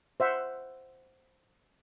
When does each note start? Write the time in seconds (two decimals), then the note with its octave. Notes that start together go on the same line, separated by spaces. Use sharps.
0.20 C5 E5 F#5